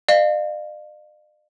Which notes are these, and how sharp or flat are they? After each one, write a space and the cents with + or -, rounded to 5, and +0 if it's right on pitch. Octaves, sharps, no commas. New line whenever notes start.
D5 +45 F5 +0